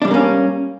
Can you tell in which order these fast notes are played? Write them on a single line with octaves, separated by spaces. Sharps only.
D4 G3 G#3 A#3 C#4